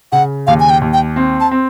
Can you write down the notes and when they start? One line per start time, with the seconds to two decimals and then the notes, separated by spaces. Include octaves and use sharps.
0.12 C#3 F#5
0.47 D#2 F5
0.60 G#5
0.70 G5
0.81 D#2
0.93 G5
1.16 C4
1.40 A5
1.51 C4